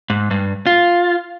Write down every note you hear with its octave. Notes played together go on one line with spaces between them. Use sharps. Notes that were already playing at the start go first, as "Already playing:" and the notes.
G#2
G2
F4